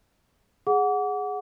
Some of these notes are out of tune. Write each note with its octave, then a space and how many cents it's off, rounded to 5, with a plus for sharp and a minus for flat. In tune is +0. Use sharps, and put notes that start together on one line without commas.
G#4 +0 F#5 -10 D6 -35